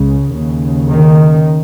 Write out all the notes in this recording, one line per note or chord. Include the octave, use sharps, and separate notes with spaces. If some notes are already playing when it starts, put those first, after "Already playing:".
Already playing: C#2 C#3
D#2 C#3
D#3